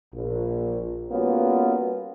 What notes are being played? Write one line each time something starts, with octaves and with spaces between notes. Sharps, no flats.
A#1
G3 A#3 B3 C#4 F4 F#4